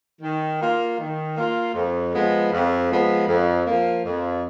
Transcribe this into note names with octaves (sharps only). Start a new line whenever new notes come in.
D#3
A#3 F4
D#3
A#3 F4
F2
F3 G#3 B3
F2
F3 G#3 B3
F2
F3 A#3
F2